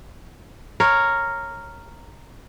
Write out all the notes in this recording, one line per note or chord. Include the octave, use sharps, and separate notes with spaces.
A#4 C#5